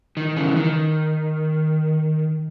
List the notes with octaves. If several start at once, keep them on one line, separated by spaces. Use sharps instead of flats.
D#3
C#3 E3
D#3